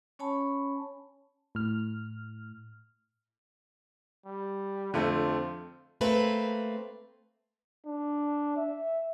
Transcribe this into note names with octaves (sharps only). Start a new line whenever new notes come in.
C#4 C#5 G#5 A5 B5 C#6
A2 F6
G3
F2 D3 A3 C4 F4
A3 A#3 C4 B4
D4
E5